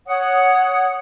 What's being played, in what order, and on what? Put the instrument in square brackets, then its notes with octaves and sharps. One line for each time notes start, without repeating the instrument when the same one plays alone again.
[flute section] C#5 F#5 D#6